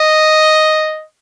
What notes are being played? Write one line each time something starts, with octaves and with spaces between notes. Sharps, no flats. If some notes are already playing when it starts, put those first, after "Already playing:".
Already playing: D#5